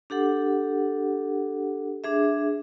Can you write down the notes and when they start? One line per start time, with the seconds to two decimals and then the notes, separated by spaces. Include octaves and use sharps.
0.10 D4 G4 A4 F#5
2.04 D4 G#4 E5